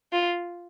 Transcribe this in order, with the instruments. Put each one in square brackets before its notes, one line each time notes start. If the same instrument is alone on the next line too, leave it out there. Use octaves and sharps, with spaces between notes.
[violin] F4